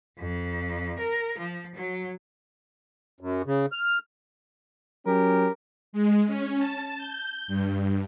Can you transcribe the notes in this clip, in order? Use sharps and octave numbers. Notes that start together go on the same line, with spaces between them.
F2
A#4
F3
F#3
F#2
C#3
F6
F#3 C#4 G4 A#4
G#3
C#4
A5
G6
G2